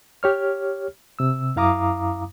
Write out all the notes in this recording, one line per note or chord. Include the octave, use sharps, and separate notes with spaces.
G4 C#5 F6
C3 E6
F#2 E4 F5 A#5 D6 D#6